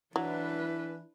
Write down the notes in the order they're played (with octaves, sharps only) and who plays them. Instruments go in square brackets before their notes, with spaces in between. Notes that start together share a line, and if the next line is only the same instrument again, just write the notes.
[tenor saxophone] E3 [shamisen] F#3 [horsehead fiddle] D4 B4 [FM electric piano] E4